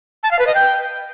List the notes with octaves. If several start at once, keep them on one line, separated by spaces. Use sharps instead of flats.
A5
F5
B4
D#5
G5